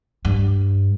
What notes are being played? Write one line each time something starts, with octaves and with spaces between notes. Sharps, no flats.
G2